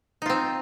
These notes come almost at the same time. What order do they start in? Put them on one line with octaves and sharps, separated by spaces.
D#4 F4 C4